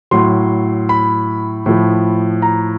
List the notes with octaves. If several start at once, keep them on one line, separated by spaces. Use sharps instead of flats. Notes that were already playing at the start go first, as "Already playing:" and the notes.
A2 F#3 C6
B5
A2 F3
A#5